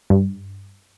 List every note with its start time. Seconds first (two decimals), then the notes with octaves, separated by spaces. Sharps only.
0.10 G2